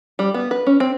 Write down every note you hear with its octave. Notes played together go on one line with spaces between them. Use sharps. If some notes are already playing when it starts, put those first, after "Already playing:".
G3
B3
B4
C#4
C4